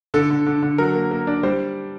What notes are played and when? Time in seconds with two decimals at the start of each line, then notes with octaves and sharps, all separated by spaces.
0.14 D3 A4
0.30 D3
0.46 D3
0.62 D3
0.78 F#3 A#4
0.95 A#3
1.11 A#3
1.27 D4
1.43 G3 C5